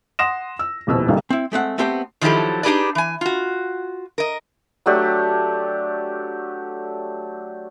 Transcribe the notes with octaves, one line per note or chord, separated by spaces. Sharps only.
F#5 C6 D#6 A#6 E7
E6
D#1 F2 B2 E4 E6
F#1 C2 G2 A#2 D3 D#3
C4 E4
G#3 A3 C4 F#5
A3 B3 C4 G4 C5 G5
D#3 F3 F#3 E4 G4 A4
D4 D#4 G4 G#4 B4 D5
E3 G#5
F4 F#4
A#4 D#5
F#3 A3 D4 G4